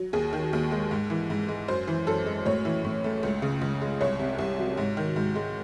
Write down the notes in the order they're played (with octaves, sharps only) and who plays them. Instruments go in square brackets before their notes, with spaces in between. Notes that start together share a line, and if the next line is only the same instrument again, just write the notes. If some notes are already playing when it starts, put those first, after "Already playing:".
Already playing: [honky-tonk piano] F#3
D#2 G#4
D#3
D#2
G#3
G#2
E3
G#2
G#3
F#2 C5
E3
F#2 A4
G#3
A2 C#5
E3
A2
A3
C#2
C#3
C#2
G#3
C2 C#5
C3
C2
F#3
G#2
D#3
G#2
G#3